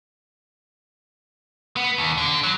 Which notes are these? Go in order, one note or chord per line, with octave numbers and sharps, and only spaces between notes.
B3
D#2
D3
F#3